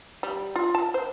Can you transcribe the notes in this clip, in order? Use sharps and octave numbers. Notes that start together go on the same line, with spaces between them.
G3
F4
A5
C5